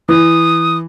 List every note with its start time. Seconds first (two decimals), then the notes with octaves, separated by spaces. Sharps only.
0.09 E3 D#6